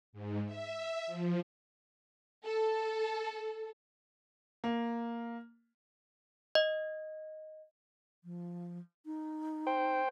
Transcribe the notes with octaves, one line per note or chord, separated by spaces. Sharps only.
G#2
E5
F3
A4
A#3
D#5
F3
D#4
C5 G5